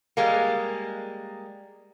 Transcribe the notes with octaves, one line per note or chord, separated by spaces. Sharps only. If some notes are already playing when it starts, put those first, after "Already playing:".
G3 G#3 A#3